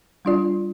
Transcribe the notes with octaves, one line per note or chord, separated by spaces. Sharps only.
G3 D4 F4 D5